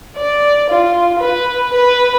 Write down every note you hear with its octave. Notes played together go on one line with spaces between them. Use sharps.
D5
F4
B4
B4